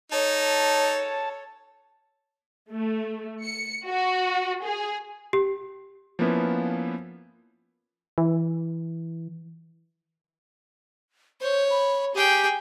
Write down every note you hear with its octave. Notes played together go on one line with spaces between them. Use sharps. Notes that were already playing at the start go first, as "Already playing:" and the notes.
D#4 A4 C#5 A5
A3
C#7
F#4
G#4
G4
F3 A#3 B3 C#4 E4 B4
E3
C5 C#5
B5
G4 G#4 G5